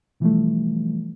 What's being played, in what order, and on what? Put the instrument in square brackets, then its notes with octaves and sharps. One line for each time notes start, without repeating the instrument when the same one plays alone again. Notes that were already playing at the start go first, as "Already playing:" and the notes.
[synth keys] B2 E3 F3 G3 A3